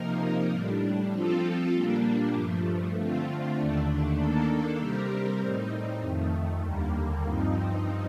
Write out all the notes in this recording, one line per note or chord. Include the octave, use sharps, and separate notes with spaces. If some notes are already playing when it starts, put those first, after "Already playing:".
Already playing: C3 F3 A#3 D#4 A#4
A2 G3 D4
F3 C4 F4 A4
A#2 G3 A#3 D4
G2 F3 A3
D3 A3 C4 F4
D#2 D3 A3 D4
D#3 A#3 D4 A4
C3 G3 C4 G4 A#4
A2 G3 C4 D#4
F2 D#3 A3
D#2 D3 G3 A#3
G2 F3 C4 D#4